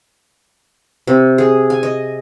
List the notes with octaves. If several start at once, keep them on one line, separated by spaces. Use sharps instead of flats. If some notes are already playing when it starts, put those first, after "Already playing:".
C3
G#4
G#5
D#5